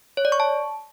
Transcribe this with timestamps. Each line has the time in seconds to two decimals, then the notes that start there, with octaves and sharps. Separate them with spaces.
0.17 C#5
0.25 D5
0.32 C#6
0.40 A5